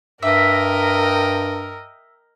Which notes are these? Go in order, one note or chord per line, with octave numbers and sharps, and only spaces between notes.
G2 A#4 D#5 E5 G5